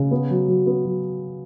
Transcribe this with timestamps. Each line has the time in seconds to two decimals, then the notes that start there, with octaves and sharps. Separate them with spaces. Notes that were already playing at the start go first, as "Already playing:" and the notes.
Already playing: C#3
0.11 B3
0.30 F#3
0.48 F#3
0.66 B3
0.85 F#3